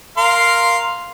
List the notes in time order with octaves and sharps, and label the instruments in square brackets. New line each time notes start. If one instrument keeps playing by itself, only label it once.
[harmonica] A#4 F5 C6